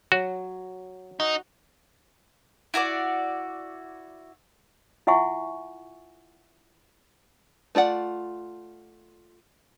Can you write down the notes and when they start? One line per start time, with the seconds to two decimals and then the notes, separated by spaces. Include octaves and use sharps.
0.12 F#3 F#4
1.20 D#4 F#4
2.74 E4 F#4 A4 D5
5.07 E4 F4 E5 F#5 G#5 C#6
7.75 A3 F4 D5 F#5